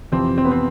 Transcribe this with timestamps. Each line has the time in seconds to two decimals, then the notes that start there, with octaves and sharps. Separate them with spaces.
0.12 F2 C3 E3 C4
0.38 C4
0.45 B3
0.51 C4